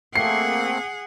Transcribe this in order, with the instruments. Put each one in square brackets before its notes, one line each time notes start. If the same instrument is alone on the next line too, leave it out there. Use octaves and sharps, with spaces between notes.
[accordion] A3 A#3 C4 [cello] G#4 F#5 [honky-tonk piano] C7